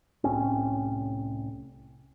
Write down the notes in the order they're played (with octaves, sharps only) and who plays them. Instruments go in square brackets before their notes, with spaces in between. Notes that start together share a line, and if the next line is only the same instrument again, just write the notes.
[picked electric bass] C2 A2 C4 C#4